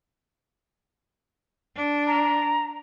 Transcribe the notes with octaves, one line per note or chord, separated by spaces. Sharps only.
D4
A#5